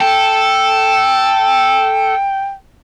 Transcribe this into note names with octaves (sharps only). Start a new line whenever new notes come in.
A4 G5